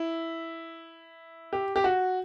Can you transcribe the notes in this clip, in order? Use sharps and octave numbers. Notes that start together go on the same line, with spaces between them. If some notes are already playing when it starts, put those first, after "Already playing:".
Already playing: E4
G4
G4
F#4